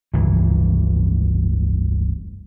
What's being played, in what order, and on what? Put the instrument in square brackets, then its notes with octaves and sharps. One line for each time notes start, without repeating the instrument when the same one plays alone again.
[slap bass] F1 C#2 G2 E3